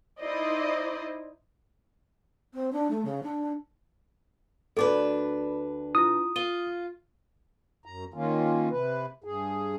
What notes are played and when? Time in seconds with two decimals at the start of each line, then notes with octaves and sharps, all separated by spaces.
0.20 D#4 E4 C5 D5 D#5
2.54 C4
2.72 D4
2.90 A3
3.05 C#3
3.23 D4
4.77 D2 D4 A4 B4 D6
5.95 E4 F4 D#6
6.36 F4 D#7 G7
7.86 F#2 A#5
8.14 D#3 A#3 C#4 F4
8.71 C3 B4
9.24 G2 G#4